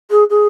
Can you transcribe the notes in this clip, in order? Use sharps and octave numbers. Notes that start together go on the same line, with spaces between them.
G#4
G#4